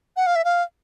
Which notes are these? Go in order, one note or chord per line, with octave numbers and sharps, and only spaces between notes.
F#5
F5
E5
F5